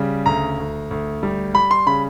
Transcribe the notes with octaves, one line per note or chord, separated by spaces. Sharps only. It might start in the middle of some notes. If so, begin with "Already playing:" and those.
Already playing: C#3 G3
D2 A#5
D2
D2
G3
G3 B5
C6
C#3 B5